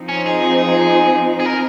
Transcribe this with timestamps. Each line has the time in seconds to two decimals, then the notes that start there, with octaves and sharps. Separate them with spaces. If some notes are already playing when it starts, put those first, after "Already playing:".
Already playing: F3 C4 D#4
0.09 C#4
0.26 G#4
1.40 G#4
1.45 A#4